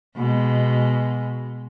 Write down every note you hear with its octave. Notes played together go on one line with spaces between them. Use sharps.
B2 G#3